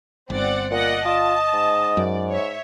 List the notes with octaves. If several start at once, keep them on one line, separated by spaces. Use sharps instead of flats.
G1 C4 D5 F#5
A#2 D5 D#5 F#5
F4 D#5 A5
G#2
F#2 D5
C#5 E5